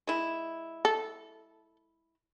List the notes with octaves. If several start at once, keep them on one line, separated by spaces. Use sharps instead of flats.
G#3 E4
A4